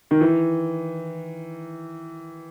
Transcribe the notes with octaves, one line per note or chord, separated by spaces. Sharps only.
D#3
E3